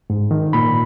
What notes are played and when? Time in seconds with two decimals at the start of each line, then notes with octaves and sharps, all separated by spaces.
0.10 G#2
0.31 D#3
0.53 A#2 B5